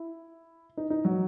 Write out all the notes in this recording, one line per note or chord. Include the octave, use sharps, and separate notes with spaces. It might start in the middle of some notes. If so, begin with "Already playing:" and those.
Already playing: E4
D#4
D#4
F#3